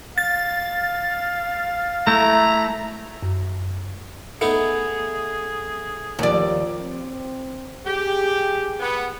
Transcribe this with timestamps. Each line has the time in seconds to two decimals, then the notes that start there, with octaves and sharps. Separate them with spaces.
0.18 F5 A6
2.07 A3 E4 A#5
3.23 F#2
4.41 A3 B3 D#4 G#4 C#7
6.19 D#2 F3 G4 A#4 D5
6.81 C4
7.86 G4 G#4
8.80 B3